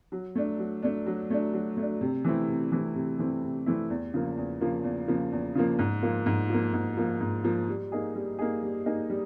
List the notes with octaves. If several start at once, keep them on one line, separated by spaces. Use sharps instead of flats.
F#3
A3 D4
F#3
A3 D4
F#3
A3 D4
F#3
A3 D4
C3
E3 A3 C4 E4
C3
E3 A3 C4 E4
C3
E3 A3 C4 E4
C3
E3 A3 C4 E4
E2
C#3 F3 A#3
E2
C#3 F3 A#3
E2
C#3 F3 A#3
E2
C#3 F3 A#3
G#2
F3 A#3
G#2
F3 A#3
G#2
F3 A#3
G#2
F3 A#3
G3
A#3 D#4 G#4
G3
A#3 D#4 G#4
G3
A#3 D#4 G#4
G3